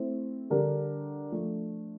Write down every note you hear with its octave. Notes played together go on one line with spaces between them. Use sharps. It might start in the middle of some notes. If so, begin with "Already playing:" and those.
Already playing: A3 C4 E4
D3 G3 D4 G4 A#4
F3 A3 D4